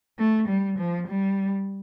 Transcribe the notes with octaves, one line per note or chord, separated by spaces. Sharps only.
A3
G3
F3
G3